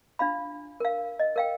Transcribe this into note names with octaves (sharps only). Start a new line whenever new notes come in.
D4 F4 F5 B5
A#4 F5
D#5
A#4 F5 G5